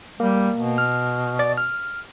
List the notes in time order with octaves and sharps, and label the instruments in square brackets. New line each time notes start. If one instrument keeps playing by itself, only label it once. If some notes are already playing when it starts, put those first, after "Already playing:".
[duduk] G3 [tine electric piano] A#3
[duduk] B2
[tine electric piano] F6
D5 A6
F6